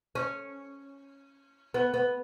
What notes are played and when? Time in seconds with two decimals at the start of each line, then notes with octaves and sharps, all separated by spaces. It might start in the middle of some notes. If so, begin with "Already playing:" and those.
0.15 C#4
1.74 B3
1.94 B3